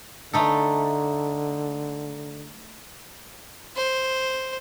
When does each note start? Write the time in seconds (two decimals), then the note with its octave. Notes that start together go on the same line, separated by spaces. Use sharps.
0.33 D3 A3 D#4 A4
3.77 C5